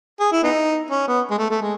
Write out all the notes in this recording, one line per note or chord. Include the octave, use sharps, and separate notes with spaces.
G#4
E4
B3 D#4
C#4
B3
G#3
A3
A3
G#3